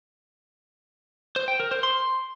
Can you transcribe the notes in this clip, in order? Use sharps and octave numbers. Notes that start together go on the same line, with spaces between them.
C5
G5
A#4
C5
C6